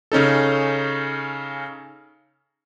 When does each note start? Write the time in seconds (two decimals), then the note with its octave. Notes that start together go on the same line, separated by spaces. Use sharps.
0.12 C#3 C#4 D#4 A4